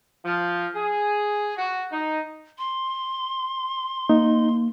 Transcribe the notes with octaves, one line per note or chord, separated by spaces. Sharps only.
F3
G#4
F#4
D#4
C6
A#3 D#4